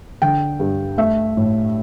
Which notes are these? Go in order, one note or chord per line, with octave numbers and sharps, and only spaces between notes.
D3 G5
G2
A3 E5
A2